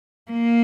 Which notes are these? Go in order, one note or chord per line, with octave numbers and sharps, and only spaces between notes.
A#3